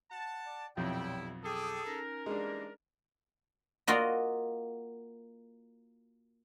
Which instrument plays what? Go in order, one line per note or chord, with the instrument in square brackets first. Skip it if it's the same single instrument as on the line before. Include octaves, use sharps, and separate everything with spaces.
[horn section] F#5 A5
[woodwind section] D5
[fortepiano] B1 F2 [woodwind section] A#2 C#5 G5 [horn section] G3 E4
[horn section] G#4 A4 [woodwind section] G5 D6 D#6
[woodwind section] C#4 D#4 A#4
[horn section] E3 G3 A#3 [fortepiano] G#3 D4
[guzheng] A#3 F4 F#4 D#5